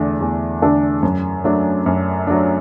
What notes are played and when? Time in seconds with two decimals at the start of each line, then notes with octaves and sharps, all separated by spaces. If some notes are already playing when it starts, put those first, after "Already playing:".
Already playing: E2 D3 A3 D4
0.21 E2
0.62 D3 A3 D4 A4
1.03 F#2
1.44 F#3 A3 D4
1.86 F#2
2.27 F#3 A3 D4